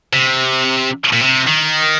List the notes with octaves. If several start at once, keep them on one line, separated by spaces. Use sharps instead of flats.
C3
A#2
C3
D#3